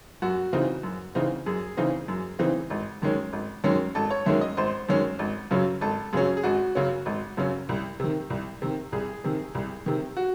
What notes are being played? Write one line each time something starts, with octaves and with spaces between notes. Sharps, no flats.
F#2 F#4
C#3 E3 C4 D#4
F#2
C#3 E3 C4 D#4
F#2 G#4
C#3 E3 C4 D#4
F#2
C#3 E3 C4 D#4
G#1
F#2 D#3 G#3 C#4
G#1
F#2 D#3 G#3 C#4
G#1 A4
C#5
F#2 D#3 G#3 C#4 E5
D#5
G#1 C5
F#2 D#3 G#3 C#4
G#1
F#2 C#3 F#3 C#4
G#1 A4
F#2 C#3 F#3 C#4 G#4
G#4
G#1 F#4
F#2 C#3 F#3 C#4
G#1
F#2 C#3 F#3 C#4
C2
C3 D#3
C2
C3 D#3
C2 G#4
C3 D#3
C2
C3 D#3
F#4